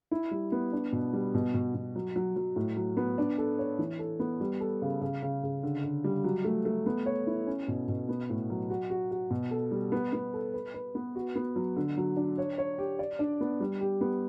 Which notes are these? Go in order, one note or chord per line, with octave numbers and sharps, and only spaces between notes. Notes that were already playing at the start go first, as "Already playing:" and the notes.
E4
G3
B3
D4
B2
G3
B2
B2
B2
F#3
F#3
F#3
A2
F#3
B3
D4
A4
C#5
E3
A4
B3
G3
A4
C#3
C#3
C#3
C#3
D3
D3
G3
F#3
A3
A3
B3
C#5
E4
C#4
B2
B2
B3
A2
F#3
F#4
F#4
F#4
B2
A4
G3
B3
B3
A4
B4
B4
B3
F#4
B3
F#3
D3
F#3
D4
C#5
C#5
G4
D5
D4
B3
G3
G4
B3